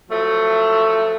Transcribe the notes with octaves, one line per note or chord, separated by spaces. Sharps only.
F3 F#3 A3